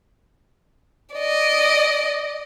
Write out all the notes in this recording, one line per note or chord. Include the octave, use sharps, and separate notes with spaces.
D5 D#5